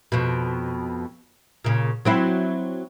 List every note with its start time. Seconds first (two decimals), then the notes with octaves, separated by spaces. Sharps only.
0.12 F2 B2
1.64 A#2 C#3
2.05 F#3 C4 E4